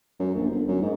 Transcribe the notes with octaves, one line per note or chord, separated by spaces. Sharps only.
F#2
A#1
G1
F#2
G#2